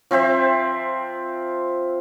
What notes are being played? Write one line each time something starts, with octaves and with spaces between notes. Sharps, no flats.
F3 C4 C5 E5